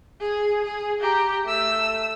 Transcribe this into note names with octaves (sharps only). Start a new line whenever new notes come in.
G#4
G#4
G4 A#5
A3 E6